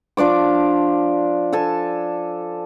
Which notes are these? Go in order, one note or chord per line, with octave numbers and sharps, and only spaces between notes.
F3 D4 D5 D6
A4 G#5 A5